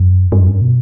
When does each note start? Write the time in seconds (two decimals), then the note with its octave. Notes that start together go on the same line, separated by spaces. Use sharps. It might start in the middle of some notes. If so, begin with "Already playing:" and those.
Already playing: F#2
0.32 G2
0.40 F#2
0.48 G2
0.62 B2